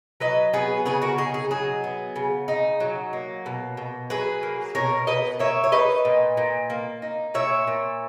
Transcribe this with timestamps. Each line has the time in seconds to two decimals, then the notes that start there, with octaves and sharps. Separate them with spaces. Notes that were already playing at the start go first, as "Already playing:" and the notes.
0.20 F#3 B4 D#5
0.53 B3 G#4 B4
0.85 C#3 G#4 B4
1.02 F#4 A#4
1.18 D#4 G#4
1.34 G#4
1.51 F#3 G#4
1.84 B3
2.16 C#3
2.48 D#4
2.80 F#3
3.13 A#3
3.46 B2
3.77 B2
4.10 F#3 G#4 B4
4.43 A#3
4.75 B2 A#4 C#5
5.07 B2 B4 D#5
5.39 A#3 C#5 E5
5.64 C#5
5.72 D#4 B4 D#5
6.05 A#2
6.37 A#2
6.70 A#3
7.02 D#4
7.34 A#2 C#5 E5
7.67 A#2